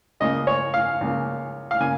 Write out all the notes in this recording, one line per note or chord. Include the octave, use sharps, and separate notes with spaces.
C#2 C#3 A#3 D#5
C#5
F5
C#2 C#3 A#3
F5
C#3 A#3 G#5